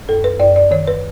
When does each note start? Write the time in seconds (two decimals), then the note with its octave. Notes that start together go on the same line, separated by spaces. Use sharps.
0.09 F#2 A4
0.24 B4
0.40 F#2 D5
0.56 D5
0.71 D#3 C#5
0.88 B4